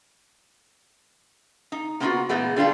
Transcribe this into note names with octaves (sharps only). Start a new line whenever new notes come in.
D#4
A#3 B3 C#4 D#4 F4 F#4
A#2 E3 G#3 A3 B3
D3 G3 E4 F4 A4